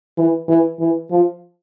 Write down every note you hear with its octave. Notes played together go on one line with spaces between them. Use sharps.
E3
E3
E3
F3